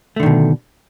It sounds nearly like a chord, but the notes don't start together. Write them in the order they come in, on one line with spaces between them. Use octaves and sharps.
A3 D3 D#3 B2